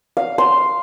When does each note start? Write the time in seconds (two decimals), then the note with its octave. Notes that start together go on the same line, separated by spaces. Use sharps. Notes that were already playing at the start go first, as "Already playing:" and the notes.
0.17 F5
0.38 C6